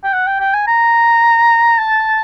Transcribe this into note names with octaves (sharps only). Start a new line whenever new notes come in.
G5
F#5
G5
G5
G#5
A#5
A5